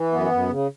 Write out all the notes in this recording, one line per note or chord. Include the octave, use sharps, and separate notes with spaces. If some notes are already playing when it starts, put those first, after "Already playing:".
Already playing: E3
F#2 B3
F#2
C#3